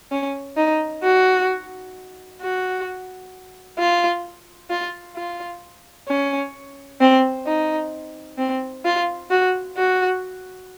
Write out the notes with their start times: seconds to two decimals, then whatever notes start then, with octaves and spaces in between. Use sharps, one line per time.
0.11 C#4
0.57 D#4
1.03 F#4
2.41 F#4
3.79 F4
4.70 F4
5.16 F4
6.08 C#4
7.01 C4
7.47 D#4
8.38 C4
8.85 F4
9.30 F#4
9.77 F#4